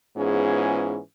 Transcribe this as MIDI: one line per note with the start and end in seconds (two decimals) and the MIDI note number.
0.16 0.98 44
0.16 0.98 52
0.16 0.98 59
0.16 0.98 61
0.16 0.98 65
0.16 0.98 68